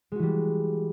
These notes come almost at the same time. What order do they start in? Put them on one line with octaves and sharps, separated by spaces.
G#3 F#4 E3 G3